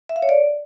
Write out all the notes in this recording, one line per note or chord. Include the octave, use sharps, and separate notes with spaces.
E5
F5
C#5
D5